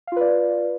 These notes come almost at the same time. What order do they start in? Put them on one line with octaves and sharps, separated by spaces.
F5 F4 B4 D5